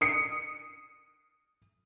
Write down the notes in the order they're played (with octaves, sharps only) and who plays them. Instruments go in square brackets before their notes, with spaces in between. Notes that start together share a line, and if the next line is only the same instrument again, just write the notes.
[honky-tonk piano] D#6 C#7 D7